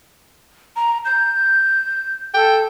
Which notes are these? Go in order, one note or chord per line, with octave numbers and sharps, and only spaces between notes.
A#5
G6
A4 G5